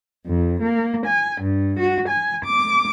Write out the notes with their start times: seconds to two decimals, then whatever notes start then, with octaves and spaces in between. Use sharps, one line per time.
0.25 F2
0.62 A#3
1.06 G#5
1.41 G2
1.78 F#4
2.08 G#5
2.44 D6